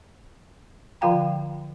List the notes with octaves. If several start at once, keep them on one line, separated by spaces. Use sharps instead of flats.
D3 F3 F4 F5 G5 A#5